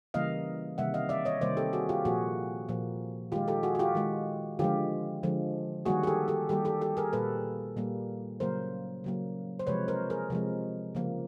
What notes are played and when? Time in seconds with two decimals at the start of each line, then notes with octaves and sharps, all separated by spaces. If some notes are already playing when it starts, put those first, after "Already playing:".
0.14 C#3 E3 G3 A#3 D#5 F5
0.78 C3 D#3 G3 A#3 E5 F#5
0.94 D#5 F5
1.09 D5 E5
1.25 C#5 D#5
1.41 C3 D#3 G3 A#3 C5 D5
1.57 G4 A4
1.73 F#4 G#4
1.89 F4 G4
2.05 A#2 F3 A#3 F#4 G#4
2.69 A#2 F3 A#3
3.32 D#3 G#3 F4 G4
3.48 G4 A4
3.63 F#4 G#4
3.75 F#4
3.79 F4 G4
3.95 D#3 G#3
4.59 D3 F3 G#3 F4 G4
5.23 D3 F3 G#3
5.86 D#3 G3 A#3 F#4 G#4
6.03 G#4
6.07 G4 A4
6.28 G4 A4
6.49 D#3 G3 A#3 G4 A4
6.65 G4 A4
6.81 G4 A4
6.97 G#4 A#4
7.13 A#2 G3 A#3 A4 B4
7.77 A#2 G3 A#3
8.40 C#3 F#3 A#3 A#4 C5
9.04 C#3 F#3 A#3
9.59 C5
9.67 C3 F3 G#3 B4 C#5
9.88 A#4 C5
10.10 G#4 A#4
10.30 C3 F3 G#3
10.95 C#3 F3 A#3